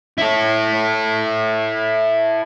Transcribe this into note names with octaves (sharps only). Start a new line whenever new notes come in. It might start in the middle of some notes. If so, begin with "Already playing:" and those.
E4 A4